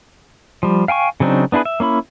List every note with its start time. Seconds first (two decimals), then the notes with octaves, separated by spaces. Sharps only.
0.63 F3 G3
0.88 F5 G5 G#5 C#6
1.20 C#3 F#3 C4 D4 D#4
1.52 B3 D4 E4 G#4 B4
1.65 E5
1.80 A#3 C#4 E4 B5